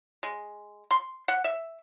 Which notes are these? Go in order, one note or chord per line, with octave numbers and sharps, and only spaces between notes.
G#3
C6
F#5
E5